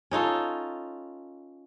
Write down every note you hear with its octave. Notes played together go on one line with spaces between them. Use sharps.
C#4 D#4 F4 A4